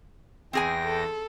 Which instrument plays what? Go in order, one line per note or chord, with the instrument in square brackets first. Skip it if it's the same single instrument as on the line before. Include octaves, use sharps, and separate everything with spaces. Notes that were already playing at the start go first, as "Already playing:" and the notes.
[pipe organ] E2 A#6 [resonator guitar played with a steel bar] C4 G#4 G#5 [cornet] G5
[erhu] A4